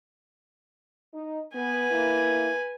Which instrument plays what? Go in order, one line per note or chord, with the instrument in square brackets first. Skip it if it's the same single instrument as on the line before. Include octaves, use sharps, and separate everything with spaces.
[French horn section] D#4
[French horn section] B3 [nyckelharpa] B4 G#5
[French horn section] A#3 E4